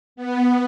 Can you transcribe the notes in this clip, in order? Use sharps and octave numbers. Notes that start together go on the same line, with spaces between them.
B3